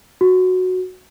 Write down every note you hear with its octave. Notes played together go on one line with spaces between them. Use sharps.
F#4